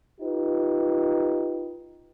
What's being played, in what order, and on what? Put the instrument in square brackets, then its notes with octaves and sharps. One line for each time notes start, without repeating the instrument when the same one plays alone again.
[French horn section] D#4 F4 G4 B4